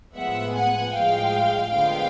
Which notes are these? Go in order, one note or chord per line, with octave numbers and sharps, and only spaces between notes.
A2 F3 G#3 B3 E5 F#5
F#5 G#5
A2 F3 G#3 F5 G5
D3 F3 G#3 B3 F5 G5